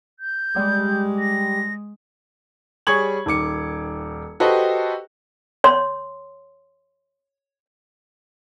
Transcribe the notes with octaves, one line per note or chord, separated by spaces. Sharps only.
G6
G3 G#3
A#6
G3 G#4 C#5 C#6 G#6 F#7
D#1 D#3 D6 C#7
F#4 G4 A4 B4 C5 D#5
C#5 C6